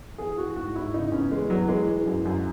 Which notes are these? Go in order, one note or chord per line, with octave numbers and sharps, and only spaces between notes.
E3 G#4
E3 F#4
G#2 F#4
G#2 E4
C#3 D#4
E2 C#4
E3 G#3
E2 F#3
E3 G#3
E3
F#2
F#2